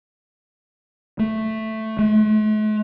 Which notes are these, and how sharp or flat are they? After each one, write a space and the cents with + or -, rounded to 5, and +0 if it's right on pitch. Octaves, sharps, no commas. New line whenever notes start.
A3 +0
A3 -45